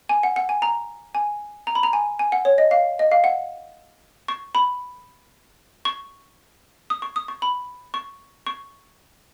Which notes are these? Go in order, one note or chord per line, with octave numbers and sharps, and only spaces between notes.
G#5
F#5
F#5
G#5
A#5
G#5
A#5
B5
A#5
G#5
G#5
F#5
C#5
D#5
F5
D#5
F5
F#5
C#6
B5
C#6
D#6
C#6
D#6
C#6
B5
C#6
C#6